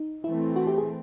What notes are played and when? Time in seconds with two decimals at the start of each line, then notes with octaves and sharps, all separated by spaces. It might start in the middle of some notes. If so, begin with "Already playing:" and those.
Already playing: D#4
0.24 E3 A3 C4 E4
0.56 F#4
0.67 G4
0.78 G#4